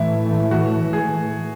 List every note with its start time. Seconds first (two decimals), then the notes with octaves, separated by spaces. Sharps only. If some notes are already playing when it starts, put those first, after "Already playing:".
Already playing: A2 E3 A3 E4
0.51 F#4
0.93 G#4